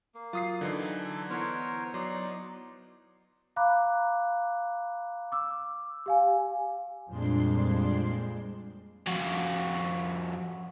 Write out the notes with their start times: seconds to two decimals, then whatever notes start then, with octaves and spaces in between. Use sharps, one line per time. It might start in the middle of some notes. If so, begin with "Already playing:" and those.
0.15 A#3
0.33 F#3 F4 D#6 C7
0.61 D3 E3 D#4
1.00 A4
1.30 B3 E4 A#4 C5 C#5 F#5
1.94 F#3 D#4 D5 C6
3.56 F5 A#5 B5 D6 F#6
5.32 D6 E6
6.06 G4 F5 G#5
7.09 F2 A#2 G3 G#3 D4 C6
9.07 F2 F#4